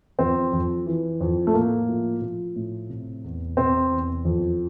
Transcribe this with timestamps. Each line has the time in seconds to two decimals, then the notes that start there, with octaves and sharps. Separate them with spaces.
0.19 F2 C4
0.53 F2
0.86 E3
1.21 F2
1.47 A3
1.54 A2 A#3
1.89 F3
2.22 F3
2.56 A2
2.89 C3
3.24 E2
3.57 C3 C4
3.91 E2
4.25 F2